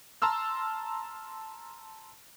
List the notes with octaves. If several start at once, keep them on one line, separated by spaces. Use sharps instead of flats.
A5 A#5 C6 E6 F6